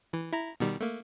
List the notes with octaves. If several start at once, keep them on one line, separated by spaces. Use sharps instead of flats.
E3
E4 A#5
B2 D#3 G3
A3 A#3